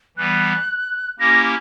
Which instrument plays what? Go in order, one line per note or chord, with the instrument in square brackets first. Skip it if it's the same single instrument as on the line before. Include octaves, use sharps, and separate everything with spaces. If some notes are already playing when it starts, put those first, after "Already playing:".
[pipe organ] E3 G3 B3 [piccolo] F#6
[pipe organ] A#3 C#4 E4 G4 [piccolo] A#6